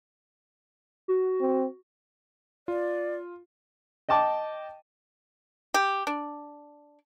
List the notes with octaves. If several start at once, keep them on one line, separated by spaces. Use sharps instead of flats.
F#4
C4
F4 D5
D#5 G5 A5 D6
G4
D4